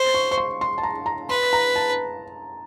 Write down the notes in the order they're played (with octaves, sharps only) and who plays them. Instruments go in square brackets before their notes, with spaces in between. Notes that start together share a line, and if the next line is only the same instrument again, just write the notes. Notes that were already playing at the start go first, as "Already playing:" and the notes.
Already playing: [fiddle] C5
[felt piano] C#6
C#6
C6
C6
A5
A#5
A#5
[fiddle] B4 [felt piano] C6
[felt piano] A#5
A5